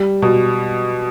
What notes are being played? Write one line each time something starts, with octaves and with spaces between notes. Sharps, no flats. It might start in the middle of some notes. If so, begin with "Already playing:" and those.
Already playing: G3
B2